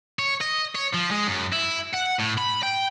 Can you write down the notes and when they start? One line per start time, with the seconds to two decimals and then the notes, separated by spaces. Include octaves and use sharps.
0.19 C#5
0.41 D#5
0.75 C#5
0.93 F3
1.11 G#3
1.27 F#2
1.53 E4
1.94 F#5
2.20 A2
2.38 B5
2.63 G5